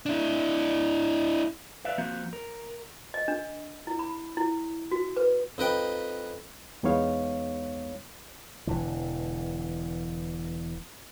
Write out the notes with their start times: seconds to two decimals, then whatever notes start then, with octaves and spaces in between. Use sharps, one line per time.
0.06 D4 E4
1.85 B4 D5 E5 F5
1.98 F3 A#3 C4 F#4
2.33 A#4
3.14 D#5
3.28 D4
3.87 E4
3.99 B5
4.37 E4
4.91 F#4
5.16 B4
5.58 F2 D#4 B4 G5
6.83 E2 G#3 B3 D#4 C#5 F5
8.67 E1 D3 E3